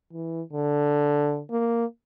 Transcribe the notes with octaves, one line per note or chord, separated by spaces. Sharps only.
E3
D3
A#3